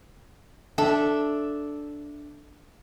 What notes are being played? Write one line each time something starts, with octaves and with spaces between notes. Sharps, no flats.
D4 A4 E5